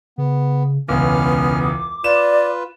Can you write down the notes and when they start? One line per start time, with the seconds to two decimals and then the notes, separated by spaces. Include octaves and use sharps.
0.18 C#3 B3
0.88 E1 C#2 B3 C#4 D6 F6
2.04 F4 B4 D5 E7